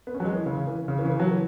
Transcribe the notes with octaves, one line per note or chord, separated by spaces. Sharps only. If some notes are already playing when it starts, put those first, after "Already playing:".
B3
C#4
F#3
G#3
E3
C#3
C#3
E3
C#3
E3
C#3
E3
F#3
E3